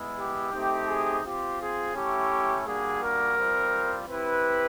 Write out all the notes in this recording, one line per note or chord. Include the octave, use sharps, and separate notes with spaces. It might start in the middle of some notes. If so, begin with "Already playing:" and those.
Already playing: G#3 B3 E4
G4
A3 C4 D#4 G4
G#4
C4 F4 G4
G#4
A3 C#4 E4 G4
G3 A#3 D4 F#4 G#4
A#4
G3 C4 F4
C4 E4 G4 B4